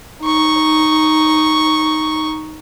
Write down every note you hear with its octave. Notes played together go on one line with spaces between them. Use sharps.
D#4 C#6